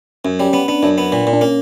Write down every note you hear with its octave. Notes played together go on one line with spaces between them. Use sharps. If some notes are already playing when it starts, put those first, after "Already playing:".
F#2 C#4
G3 C#4
B3 C#4
B3 D4
F#2 D4
B3
A#2
A#2
D4
A#3 C#4